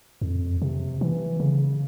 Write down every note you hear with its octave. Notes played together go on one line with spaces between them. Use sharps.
F2
C3
E3
C#3